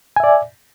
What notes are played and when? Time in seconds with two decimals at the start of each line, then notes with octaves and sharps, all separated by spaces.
0.16 G#5
0.20 E5
0.24 D5